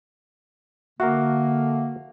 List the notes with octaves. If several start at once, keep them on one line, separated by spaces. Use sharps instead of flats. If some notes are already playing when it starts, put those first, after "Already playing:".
D3 A#3 F#4 A#4 E5 F#5